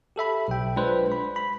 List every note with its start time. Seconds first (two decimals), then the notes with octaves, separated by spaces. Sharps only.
0.16 G4 A4 E5 B5
0.48 B1 G5
0.76 G#3 D4 F4 B4 C5
1.12 B5
1.36 B5